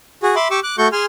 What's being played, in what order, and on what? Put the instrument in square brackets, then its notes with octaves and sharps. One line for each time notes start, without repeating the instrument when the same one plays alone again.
[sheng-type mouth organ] F#4 G#4
E5 B5 C6 D6
G4 C#6 D6 E6
D6 F#6
A3 F#4 A4 C#6 G6
G#4 G#5 C6 F6